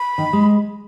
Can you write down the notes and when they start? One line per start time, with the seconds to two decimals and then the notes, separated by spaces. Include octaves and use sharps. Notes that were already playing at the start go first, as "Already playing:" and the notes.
Already playing: B5
0.18 D#3
0.33 G#3